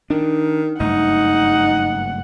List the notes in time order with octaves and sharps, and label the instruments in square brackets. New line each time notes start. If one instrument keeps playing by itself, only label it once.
[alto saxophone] D#3 [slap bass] D4
[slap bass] F#1 G2 A3 [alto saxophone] D#4 [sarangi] F#5